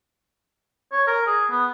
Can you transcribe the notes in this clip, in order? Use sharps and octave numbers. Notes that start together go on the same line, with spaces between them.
C#5
A#4
G#4
B3